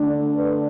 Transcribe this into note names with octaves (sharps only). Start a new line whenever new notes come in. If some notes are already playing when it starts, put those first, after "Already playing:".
Already playing: D3 A3 D4
B4